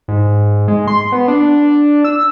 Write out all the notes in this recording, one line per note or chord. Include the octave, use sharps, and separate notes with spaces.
G#2
G#3
C6
B3
D4
E6